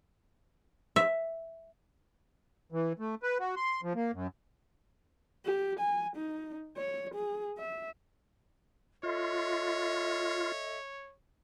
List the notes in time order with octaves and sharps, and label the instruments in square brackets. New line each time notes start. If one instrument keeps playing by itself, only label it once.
[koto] E5
[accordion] E3
A3
B4
F#4
C6
F3
A#3
F#2
[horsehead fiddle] G4
G#5
D#4
C#5
G#4
E5
[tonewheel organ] F4 [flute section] A4 D#5 E5 [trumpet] C#5